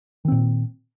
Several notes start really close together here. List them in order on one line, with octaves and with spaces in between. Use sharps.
D#3 C4 A#2